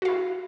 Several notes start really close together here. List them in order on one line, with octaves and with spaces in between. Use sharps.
F#4 F5 E4